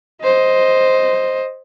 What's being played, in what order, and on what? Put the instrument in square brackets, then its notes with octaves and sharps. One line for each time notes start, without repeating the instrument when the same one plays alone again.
[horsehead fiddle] C5 D#5